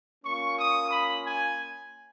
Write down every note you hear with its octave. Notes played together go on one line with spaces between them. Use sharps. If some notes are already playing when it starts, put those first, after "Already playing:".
A#3 C#4 F4 C#6
D#6
B5
G#5